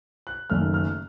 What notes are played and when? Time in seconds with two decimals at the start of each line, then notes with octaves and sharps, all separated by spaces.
0.27 F#6
0.50 F#1 F#2 D#3 A3 F6
0.74 F6